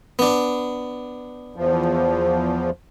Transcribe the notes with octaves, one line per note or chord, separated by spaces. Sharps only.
B3 D4
E2 F3